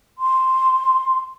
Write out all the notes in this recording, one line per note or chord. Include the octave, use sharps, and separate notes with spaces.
C6